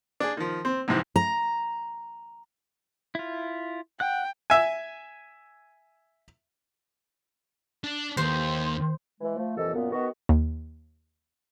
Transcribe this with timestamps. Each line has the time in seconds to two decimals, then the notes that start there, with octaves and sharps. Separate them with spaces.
0.20 D4 G#4
0.37 D#3 F3
0.65 C4
0.88 A#1 G#2 C3 E3
1.16 A#5
3.15 E4 F4
4.00 F#5 G5 F#6
4.50 E5 G#5
7.84 D4
8.17 D#2 C5
9.21 E3 G#3
9.36 F3 A3
9.57 C2 F2 A#2 E3 A4 D#5
9.75 F#2 A#2 A#3 B3
9.91 D#3 B3 F#4
10.29 D#2